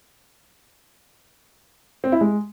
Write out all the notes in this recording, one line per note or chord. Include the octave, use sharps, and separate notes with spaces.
C4
E4
G#3